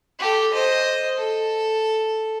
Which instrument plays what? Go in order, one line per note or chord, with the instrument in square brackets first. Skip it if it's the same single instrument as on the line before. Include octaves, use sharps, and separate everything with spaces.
[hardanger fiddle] G4 A4
C5 D#5
A4